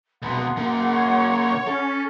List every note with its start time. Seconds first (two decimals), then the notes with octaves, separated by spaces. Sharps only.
0.22 C#2 B2 F#5 C6
0.57 C#3 A#3
0.92 C#5
1.67 C#4 A4